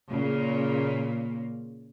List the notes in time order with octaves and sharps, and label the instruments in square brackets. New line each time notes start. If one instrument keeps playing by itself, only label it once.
[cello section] A#2 C#3 A#3